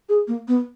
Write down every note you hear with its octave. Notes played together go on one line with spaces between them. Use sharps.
G#4
A#3
B3